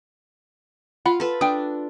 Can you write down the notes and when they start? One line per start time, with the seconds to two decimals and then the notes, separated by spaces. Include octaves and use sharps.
1.06 F4 F#5 B5
1.20 A4 B4
1.41 D4 G5 D#6